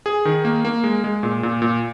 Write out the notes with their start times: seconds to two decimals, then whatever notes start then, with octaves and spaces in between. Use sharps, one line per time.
0.06 G#4
0.25 D#3
0.45 A#3
0.65 A#3
0.84 G#3
1.04 G#3
1.23 A#2
1.43 A#2
1.62 A#2